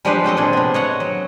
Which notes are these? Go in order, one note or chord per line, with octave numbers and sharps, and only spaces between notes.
F3 G3 G#3 D4 B4 C5
F#3 C4 A4 D#5
A#2 D4 G#4
C3 B3
C#5 D#5 F#5
F#3